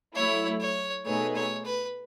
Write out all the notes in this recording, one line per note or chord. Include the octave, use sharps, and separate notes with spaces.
F#3 A3 E4 C#5
C#5
B2 A3 D#4 G#4 B4 C#5
C#5
B4